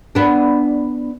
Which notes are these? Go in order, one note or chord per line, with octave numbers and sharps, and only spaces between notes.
B3 D4